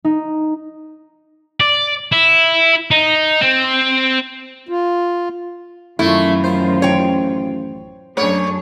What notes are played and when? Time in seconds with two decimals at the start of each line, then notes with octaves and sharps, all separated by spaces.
0.05 D#4
1.60 D5
2.12 E4
2.91 D#4
3.41 C4
4.69 F4
5.99 A1 F#2 D#3 A3 E4 F4
6.44 C5
6.82 C#5 G5
8.17 F#2 A3 D4 G#4 C#5